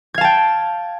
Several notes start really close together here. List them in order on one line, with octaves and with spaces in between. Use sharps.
G#6 F5 A5 G5